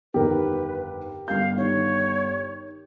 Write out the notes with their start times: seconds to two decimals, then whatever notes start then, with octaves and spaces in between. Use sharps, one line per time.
0.14 G1 F2 D#3 G4 A#4 B4
1.28 G1 F5 G6
1.57 D#3 C#5